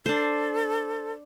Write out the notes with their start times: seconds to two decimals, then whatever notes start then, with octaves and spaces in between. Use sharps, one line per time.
0.06 D4 A4 C5